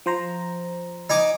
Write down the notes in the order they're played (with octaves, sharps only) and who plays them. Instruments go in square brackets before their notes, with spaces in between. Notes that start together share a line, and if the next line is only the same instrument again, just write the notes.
[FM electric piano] F3 C5 A#5
[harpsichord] D#4 G#5 D6